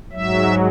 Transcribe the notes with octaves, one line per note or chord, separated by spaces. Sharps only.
G#2 F#3 E5